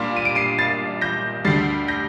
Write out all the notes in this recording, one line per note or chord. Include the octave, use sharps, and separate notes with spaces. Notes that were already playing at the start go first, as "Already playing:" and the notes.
Already playing: A#2 G3 A#3 D4 F4
D#7
D7
C7 D#7
A6 C7
G6 A#6
D2 D3 G3 A6 C7
G6 A#6